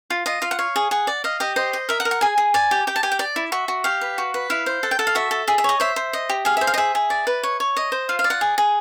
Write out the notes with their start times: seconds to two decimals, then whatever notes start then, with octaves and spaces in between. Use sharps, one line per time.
0.10 F4
0.26 F4 D#5
0.42 F4 F5
0.51 F#5
0.59 C#5 F5
0.76 G#4
0.91 G#4 F#5
1.07 D5
1.24 D#5 F5
1.40 G4 D#5
1.56 C5 D#5
1.73 D#5
1.89 A#4 E5
2.00 F#5
2.05 A#4
2.11 F#5
2.21 G#4 G#5
2.38 G#4
2.54 D5 G#5
2.71 G4
2.87 G4 G5
2.96 A5
3.03 G4 G#5
3.12 G5
3.19 D5
3.36 E4
3.52 F#4 E5
3.68 F#4
3.84 G4 F5
4.01 B4
4.18 F#4
4.34 B4
4.50 E4 F5
4.66 C5
4.83 A4 F#5
4.91 G5
4.99 A4 F#5
5.07 F5
5.15 F#4 E5
5.31 A4
5.48 G#4 E5
5.58 E5
5.64 C#5 D#5
5.80 C5 E5
5.96 C5
6.13 D#5
6.29 G4
6.45 G#4 F5
6.57 C5 E5
6.67 F5
6.74 D#5
6.78 G#4 E5
6.95 G#4
7.10 D5
7.27 B4
7.43 C#5
7.60 C#5
7.77 D#5
7.92 C5
8.09 F4 F5
8.19 F5
8.24 D5
8.30 F#5
8.41 G#4
8.58 G#4